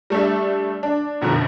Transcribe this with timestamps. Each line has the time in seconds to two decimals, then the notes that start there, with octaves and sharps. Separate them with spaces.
0.10 G3 A3 D4 E5
0.83 D4
1.21 F#2 B2 D3 D#3 F3